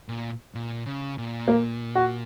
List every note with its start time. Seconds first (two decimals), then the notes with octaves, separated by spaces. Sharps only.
0.09 A#2
0.55 A#2
0.86 C#3
1.18 A#2
1.48 A#3
1.95 F#4